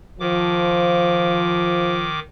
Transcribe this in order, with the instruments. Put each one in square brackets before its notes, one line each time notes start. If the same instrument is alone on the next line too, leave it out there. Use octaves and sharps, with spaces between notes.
[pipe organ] D#3 D6 [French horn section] F3